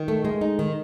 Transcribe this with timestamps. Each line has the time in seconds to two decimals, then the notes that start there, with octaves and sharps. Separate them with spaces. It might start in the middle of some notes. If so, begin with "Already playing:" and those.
Already playing: D#3
0.08 A3
0.25 G#3
0.41 D#4
0.59 D#3